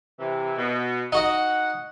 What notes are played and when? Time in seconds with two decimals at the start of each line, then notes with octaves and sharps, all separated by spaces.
0.19 C3 E3
0.57 B2
1.12 D#4 F#4 D#5 F#5